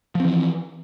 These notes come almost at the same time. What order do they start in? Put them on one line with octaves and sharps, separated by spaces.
F3 C4 E3